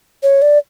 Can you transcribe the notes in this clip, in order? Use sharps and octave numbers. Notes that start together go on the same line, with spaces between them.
C#5
D5